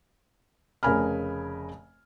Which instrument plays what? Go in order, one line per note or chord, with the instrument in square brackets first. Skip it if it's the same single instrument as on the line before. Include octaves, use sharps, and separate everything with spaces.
[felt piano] F1 C#3 A#4 G#5 B5 F6